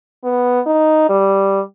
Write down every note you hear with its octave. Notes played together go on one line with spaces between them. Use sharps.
B3
D#4
G3